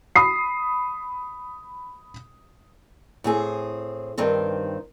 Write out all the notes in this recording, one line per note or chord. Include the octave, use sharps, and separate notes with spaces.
B5 D#6 C7
A2 C4 G#4
G2 D#3 C4